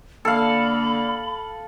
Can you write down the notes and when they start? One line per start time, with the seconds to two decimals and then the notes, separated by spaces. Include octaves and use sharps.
0.25 D3 A#3 A4 F5 B5